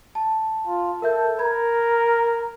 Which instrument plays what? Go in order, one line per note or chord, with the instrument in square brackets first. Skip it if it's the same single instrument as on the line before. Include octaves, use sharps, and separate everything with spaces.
[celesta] A5
[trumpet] F4
[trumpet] A4 [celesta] A#4 E5 G6
[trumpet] A#4 [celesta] B5 G#6